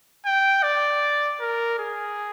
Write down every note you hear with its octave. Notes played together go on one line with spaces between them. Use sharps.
G5
D5
A#4
G#4